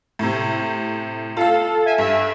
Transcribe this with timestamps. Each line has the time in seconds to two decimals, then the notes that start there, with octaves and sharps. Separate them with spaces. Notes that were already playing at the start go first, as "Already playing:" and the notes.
0.19 A2 C3
1.37 F4 A4 F5
1.86 E5 G#5
1.98 G2 E5